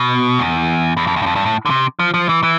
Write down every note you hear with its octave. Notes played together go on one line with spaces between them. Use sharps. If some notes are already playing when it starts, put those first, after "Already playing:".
Already playing: B2
E2
E2
F2
E2
G2
F2
G2
A2
D3
C3
F3
F3
E3
E3